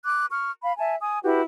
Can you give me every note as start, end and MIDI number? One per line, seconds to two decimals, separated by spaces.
0.04 0.25 86
0.04 0.25 90
0.30 0.51 85
0.30 0.51 89
0.62 0.72 77
0.62 0.72 83
0.79 0.96 76
0.79 0.96 80
0.79 0.96 81
1.01 1.20 80
1.01 1.20 87
1.23 1.41 64
1.23 1.41 66
1.23 1.41 67
1.23 1.41 71